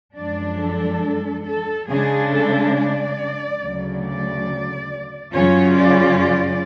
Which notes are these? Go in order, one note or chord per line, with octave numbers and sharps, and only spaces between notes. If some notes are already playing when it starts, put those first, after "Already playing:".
F#2 F3 G#3 D4 D5
A4
A4
C#3 G#3 D4 G#4
A4
D5
D2 C#3 F#3
D5
F#2 C#3 F#3 C#4 F4 C#5
D5
D5